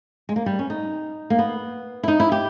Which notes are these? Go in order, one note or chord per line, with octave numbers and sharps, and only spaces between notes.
G#3
A#3
G3
C#4
D#4
A#3
B3
E4
D#4
E4
G4